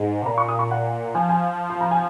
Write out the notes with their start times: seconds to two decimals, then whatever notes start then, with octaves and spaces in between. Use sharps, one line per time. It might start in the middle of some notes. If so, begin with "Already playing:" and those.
Already playing: G#2
0.22 C3
0.26 A#2 A#5
0.38 C#6
0.48 D#6
0.59 C#6
0.71 F#5
1.15 F3 G#5
1.29 G#5
1.70 C6
1.81 A#5
1.91 G#5